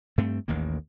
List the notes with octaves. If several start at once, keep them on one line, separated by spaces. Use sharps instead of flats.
G2 A3 C4
A1 D#2 D#3 A#3